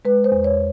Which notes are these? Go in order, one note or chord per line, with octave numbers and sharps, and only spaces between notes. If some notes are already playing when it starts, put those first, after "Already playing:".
G#3 B4
C5
E2
C#5